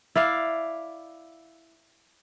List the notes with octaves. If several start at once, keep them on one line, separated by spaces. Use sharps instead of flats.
E4 D5 F5